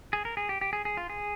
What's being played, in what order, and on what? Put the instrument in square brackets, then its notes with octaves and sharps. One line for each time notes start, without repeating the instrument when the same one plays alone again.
[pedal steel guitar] G#4
A#4
G#4
G4
G4
G#4
G#4
F4
G#4